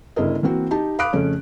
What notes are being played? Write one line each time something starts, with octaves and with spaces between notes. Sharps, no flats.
G1 C#3 E4 G#4 A#4 D#5
E3 A#3 C4 F#4
D#4 G4 A5
F5 B5 D6 D#6 F#6 D7
F2 C#3 A3 C#4